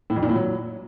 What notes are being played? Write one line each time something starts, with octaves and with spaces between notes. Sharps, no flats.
A2
F2
A#2
A2
F#3